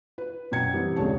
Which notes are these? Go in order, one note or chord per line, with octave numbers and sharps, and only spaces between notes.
B4
F#2 B2 G5 G#6 C#7
E3 G3 B3 C4
D#1 A#1 C#3 G#3 C#5 A5